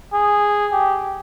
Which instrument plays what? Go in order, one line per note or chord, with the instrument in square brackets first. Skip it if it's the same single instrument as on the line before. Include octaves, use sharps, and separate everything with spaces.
[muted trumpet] G#4
G4